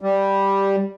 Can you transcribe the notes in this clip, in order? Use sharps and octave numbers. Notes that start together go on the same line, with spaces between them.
G3